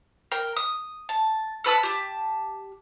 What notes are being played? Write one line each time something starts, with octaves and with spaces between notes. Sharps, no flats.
A#4 G5
D#6
A5
A4 B4 A5 E6
G4 A5